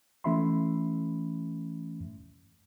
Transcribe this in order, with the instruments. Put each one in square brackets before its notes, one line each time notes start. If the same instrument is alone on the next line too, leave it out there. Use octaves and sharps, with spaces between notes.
[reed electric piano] E3 A3 C#4 E5 B5 C6